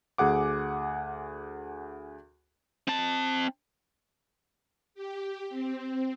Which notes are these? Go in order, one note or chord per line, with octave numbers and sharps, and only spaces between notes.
D2 G#4 F#5 D6
C4 A5
G4
C4